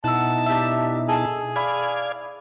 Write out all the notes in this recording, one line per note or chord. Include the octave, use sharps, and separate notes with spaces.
B2 D#4 E4 F#5 A5 E6
D4 G4 E5
G#4 A4 A5
E4 D5 F5 G#6